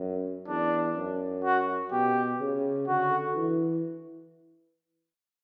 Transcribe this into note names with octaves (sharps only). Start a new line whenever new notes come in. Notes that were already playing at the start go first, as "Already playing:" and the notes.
Already playing: F#2
E2 D4
F#2
F#4
B2 G4
C#3
D3 F#4
E3